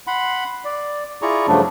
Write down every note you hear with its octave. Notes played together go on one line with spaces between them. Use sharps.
F#5 B5 C6
D5
E4 F4 G#4 D5 A#5 C#6
G2 C#3 F3 F#3 A3 D4